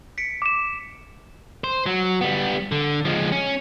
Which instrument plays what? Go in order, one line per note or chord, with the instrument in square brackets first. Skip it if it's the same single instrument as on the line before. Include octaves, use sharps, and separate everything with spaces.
[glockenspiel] B6 C#7 D7
[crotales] D6 E7
[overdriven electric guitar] C5
F#3
G3 B3
D3
F3 G#3
C#4